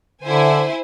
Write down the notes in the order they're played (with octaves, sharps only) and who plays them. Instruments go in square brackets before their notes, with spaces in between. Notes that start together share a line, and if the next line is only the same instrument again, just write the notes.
[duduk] D3 [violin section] E4 C5 G#5